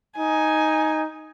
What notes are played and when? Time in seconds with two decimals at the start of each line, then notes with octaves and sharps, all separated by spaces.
0.19 D#4 G#5